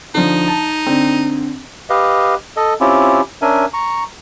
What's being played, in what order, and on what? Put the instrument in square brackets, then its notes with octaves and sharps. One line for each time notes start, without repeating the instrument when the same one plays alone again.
[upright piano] D3 F3 [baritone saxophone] D#4
[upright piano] A5
D3 C4
[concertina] G4 B4 D#5 F5
A4 D#5
C4 C#4 E4 F4 G4
C#4 D4 A#4 E5 G#5
A#5 C#6